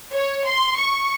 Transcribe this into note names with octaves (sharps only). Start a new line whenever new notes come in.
C#5
C6
C#6